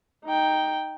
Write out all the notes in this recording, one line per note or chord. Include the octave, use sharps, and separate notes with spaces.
D#4 G5